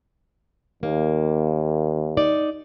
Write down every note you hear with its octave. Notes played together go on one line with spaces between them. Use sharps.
D#2 A#3
D#4 D5